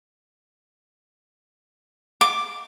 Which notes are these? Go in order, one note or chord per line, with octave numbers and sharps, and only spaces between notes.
D6